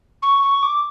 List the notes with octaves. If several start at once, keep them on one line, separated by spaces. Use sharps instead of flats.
C#6
C#6
D6